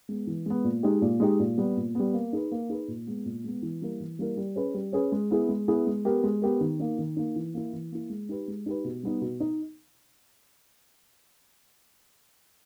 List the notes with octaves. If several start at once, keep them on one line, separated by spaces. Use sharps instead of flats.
G#3 B3
E3
G#3 B3
A#2
G#3 D#4 G4
A#2
G#3 D#4 G4
A#2
G3 B3
A#2
G3 B3
A#3
D#4 G#4 B4
A#3
D#4 G#4 B4
A#2
G#3 B3
A#2
G#3 B3
E3
G3 A#3 E4 A#4
E3
G3 A#3 E4 A#4
G3
C#4 G#4 B4
G3
C#4 G#4 B4
G#3
B3 E4 G#4
G#3
B3 E4 G#4
G#3
B3 G4 A#4
G#3
B3 G4 A#4
D#3
A#3 D#4
D#3
A#3 D#4
E3
A#3 E4
E3
A#3 E4
G#3
D#4 G4 B4
G#3
D#4 G4 B4
B2
G3 B3 D#4
B2
D#4